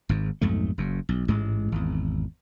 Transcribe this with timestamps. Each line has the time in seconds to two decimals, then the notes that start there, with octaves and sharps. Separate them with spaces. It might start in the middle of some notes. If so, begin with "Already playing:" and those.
0.09 G#1 G#2
0.41 B1 F2 G#2 A3
0.78 F#1 F#2
1.09 B1
1.28 A1 G#2 G#3
1.72 G#1 E2